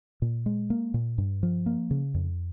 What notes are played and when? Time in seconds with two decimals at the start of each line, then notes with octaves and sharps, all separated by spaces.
0.22 A#2
0.46 G#3
0.70 A#3
0.94 A#2
1.18 G2
1.43 F3
1.66 A#3
1.91 C#3
2.14 F2